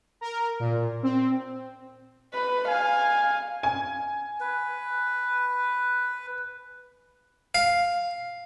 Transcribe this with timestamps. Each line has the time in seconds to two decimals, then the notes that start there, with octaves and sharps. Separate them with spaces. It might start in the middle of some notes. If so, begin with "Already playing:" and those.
0.21 A#4
0.60 A#2
1.03 C4
2.34 B4
2.68 F5 G#5
3.63 G#5
4.41 B4
7.55 F5